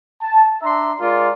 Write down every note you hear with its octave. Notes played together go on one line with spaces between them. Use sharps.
A5
D4 E5 A#5 C6
G#3 F4 A#4 D5